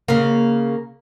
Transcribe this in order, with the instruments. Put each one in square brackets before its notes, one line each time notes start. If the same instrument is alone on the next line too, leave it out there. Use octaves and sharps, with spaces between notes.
[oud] C#3 A#3